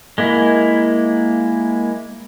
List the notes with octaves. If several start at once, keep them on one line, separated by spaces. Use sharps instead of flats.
G#3 A#3 E4